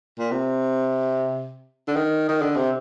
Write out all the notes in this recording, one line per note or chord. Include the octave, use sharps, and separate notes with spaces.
A#2
C3
D3
D#3
D#3
D3
C3